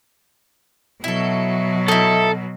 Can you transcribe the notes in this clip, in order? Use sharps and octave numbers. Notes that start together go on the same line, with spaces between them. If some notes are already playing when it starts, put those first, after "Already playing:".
B2 F#3 E4 A4
D#4 E4 A4